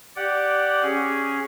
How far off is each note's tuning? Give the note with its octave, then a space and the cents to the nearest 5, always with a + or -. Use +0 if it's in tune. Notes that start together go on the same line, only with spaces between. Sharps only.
G4 -10 D5 +0 F#5 +0
C#4 +0 G#4 +0